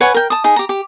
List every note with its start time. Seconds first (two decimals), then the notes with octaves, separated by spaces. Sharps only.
0.01 B4 C#5 F#5 G#5
0.14 A#4 G5
0.30 A5 D#6
0.44 D#4 G#4
0.56 G4 A#5
0.69 G4